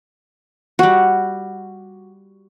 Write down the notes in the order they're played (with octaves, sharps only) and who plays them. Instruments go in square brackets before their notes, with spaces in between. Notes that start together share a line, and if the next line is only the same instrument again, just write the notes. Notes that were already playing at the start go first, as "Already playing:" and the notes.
[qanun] G3 F#4